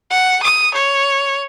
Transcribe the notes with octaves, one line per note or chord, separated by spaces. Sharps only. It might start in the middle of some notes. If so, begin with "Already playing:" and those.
F#5
D#6
C#5